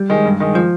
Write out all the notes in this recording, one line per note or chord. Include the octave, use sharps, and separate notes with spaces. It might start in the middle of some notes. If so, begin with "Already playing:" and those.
Already playing: G3
D#3 G#3
G2
D#3 G#3
F3